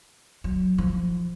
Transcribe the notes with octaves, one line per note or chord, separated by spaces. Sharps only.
F#3
F3